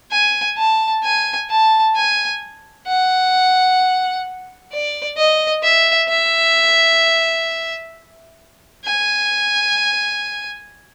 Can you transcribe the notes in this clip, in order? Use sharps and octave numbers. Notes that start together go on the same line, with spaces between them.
G#5
A5
G#5
A5
G#5
F#5
D5
D#5
E5
E5
G#5